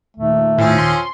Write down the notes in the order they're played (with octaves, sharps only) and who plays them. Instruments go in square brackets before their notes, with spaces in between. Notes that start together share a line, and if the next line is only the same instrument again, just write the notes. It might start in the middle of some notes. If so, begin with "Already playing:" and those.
[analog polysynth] D#2 A#2 D#3 [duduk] A3
[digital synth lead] A2 [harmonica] F3 C4 C#4
[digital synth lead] C6